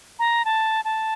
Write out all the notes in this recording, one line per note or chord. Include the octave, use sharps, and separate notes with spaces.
A#5
A5
A5